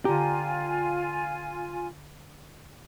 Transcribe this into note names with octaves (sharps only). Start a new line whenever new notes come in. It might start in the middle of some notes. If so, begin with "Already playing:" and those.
D3 D4 F4 G4 G#5 A#5